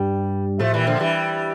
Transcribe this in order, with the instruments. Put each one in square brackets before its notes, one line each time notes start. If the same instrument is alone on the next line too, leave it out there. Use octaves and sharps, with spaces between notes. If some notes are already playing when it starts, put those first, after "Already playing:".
Already playing: [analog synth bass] G2 [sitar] G3
[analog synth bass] A2 [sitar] F3 A3
[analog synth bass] A#2 [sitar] E3 G3
[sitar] D3 F3
E3 G3